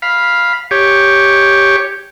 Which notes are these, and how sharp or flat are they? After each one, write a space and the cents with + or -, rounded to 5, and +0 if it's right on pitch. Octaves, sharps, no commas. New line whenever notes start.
F5 +0 B5 -10
G4 +0 C#5 +0